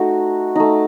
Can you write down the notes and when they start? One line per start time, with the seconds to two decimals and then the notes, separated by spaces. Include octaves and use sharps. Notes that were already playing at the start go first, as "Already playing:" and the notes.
Already playing: A3 D#4 F#4
0.55 A3 D#4